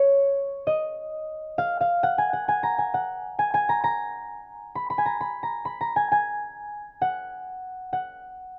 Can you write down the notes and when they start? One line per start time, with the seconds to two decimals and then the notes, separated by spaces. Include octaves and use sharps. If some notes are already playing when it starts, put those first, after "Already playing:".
Already playing: C#5
0.67 D#5
1.58 F5
1.81 F5
2.03 F#5
2.18 G#5
2.33 F#5
2.48 G#5
2.63 A#5
2.78 G#5
2.94 F#5
3.39 G#5
3.54 G#5
3.69 A#5
3.84 A#5
4.75 B5
4.90 B5
4.98 G#5
5.06 A#5
5.21 B5
5.43 A#5
5.65 B5
5.81 A#5
5.96 G#5
6.12 G#5
7.02 F#5
7.93 F#5